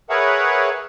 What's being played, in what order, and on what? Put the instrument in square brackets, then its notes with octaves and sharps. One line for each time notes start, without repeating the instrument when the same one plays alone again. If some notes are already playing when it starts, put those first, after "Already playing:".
[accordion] G#4 A#4 B4 C#5 E5 F#5